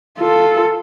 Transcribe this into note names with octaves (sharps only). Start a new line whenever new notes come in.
F4 A4